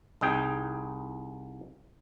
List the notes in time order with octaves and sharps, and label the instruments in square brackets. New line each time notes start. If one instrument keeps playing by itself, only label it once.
[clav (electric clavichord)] C2 D#4 G#4 G5